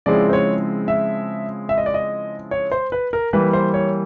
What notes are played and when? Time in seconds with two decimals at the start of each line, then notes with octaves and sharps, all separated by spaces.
0.06 C#3 F3 G#3 C4 E4 D5
0.29 C5
0.33 C#5
0.88 E5
1.69 E5
1.78 D#5
1.86 D5
1.94 D#5
2.51 C#5
2.72 C5
2.92 B4
3.13 A#4
3.33 E3 G3 A#3 B4
3.53 C5
3.74 C#5